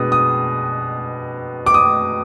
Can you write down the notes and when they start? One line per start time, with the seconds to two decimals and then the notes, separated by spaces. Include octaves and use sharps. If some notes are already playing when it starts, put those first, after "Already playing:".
Already playing: B2 G#3 D4 D#6
0.12 D#6
1.66 D6
1.74 D#6